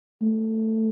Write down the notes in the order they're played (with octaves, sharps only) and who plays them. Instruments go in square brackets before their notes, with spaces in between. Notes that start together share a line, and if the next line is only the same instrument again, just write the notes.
[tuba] A3